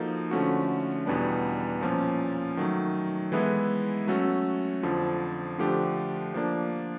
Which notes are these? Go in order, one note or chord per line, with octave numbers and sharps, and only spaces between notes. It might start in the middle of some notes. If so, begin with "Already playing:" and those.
Already playing: F3 A#3 D#4 F#4 A4
D3 F3 A3 C#4 F#4
E2 B2 G3 B3 D4
A#2 F3 A#3 C#4
D#3 F#3 A3
E3 G#3 B3 E4 A4
F#3 A3 C#4 F#4 A4
F2 D3 F3
D3 F3 A3 D4 G4
F3 A#3 D4